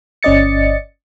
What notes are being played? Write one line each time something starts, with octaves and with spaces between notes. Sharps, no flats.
G1 C#4 D5 D#5 A6 C#7